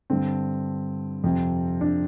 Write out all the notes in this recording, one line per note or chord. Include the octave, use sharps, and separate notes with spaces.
G2 D3 C4
F2 C3
D4